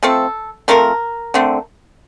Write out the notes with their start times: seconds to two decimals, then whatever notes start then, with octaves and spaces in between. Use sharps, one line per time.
0.03 F3 A3 C4 A4
0.68 F3 A3 C4 A#4
1.34 D3 A3 C4